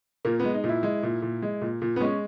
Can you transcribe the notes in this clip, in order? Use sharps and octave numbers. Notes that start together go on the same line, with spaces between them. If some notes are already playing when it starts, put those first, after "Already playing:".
A#2 A#3
G#3 B3
D#4
A#2
E4
G#3
A#2
A#2
G#3
A#2
A#2
B3
G#3 C#4